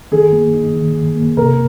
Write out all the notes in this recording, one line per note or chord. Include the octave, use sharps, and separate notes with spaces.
D#3 G#4
A#3
D#4
D#3
D#3
A#3
C3 A#4